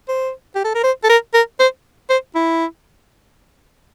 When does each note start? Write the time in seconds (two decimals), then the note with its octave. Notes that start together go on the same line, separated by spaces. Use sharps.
0.08 C5
0.55 G4
0.64 A4
0.75 A#4
0.84 C5
1.04 A4
1.09 A#4
1.34 A#4
1.60 C5
2.10 C5
2.35 E4